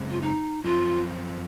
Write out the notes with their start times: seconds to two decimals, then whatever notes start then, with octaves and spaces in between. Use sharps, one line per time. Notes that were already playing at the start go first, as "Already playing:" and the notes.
Already playing: F#2 C#3 G#3 C4
0.10 F4
0.21 D#4
0.64 F#2 F3 C4 F4